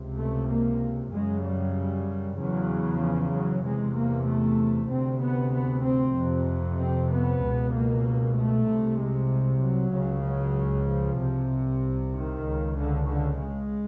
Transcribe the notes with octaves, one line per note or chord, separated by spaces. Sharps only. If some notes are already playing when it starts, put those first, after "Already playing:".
Already playing: C#2 C3
A3
A#3
F#2 C#3 G#3
G3
E2 C#3 F#3
F3
F#3
E2 C3 G#3
A#3
A3
D2 C3 C4
B3
B3
C4
F2 C3
C4
B3
C#2 B2
A#3
A3
C2 C3
G#3
F#3
C#2 C#3
F#3
F3
C2 C3
D#3
C#2 C#3
D3
D3
G#3